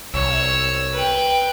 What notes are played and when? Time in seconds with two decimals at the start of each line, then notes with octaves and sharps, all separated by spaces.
0.14 C2 C#5 E6
0.94 B4 G5